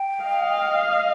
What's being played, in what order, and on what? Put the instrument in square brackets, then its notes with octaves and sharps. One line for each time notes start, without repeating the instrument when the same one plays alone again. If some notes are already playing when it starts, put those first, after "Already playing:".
Already playing: [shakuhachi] G5
[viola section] D#5 F5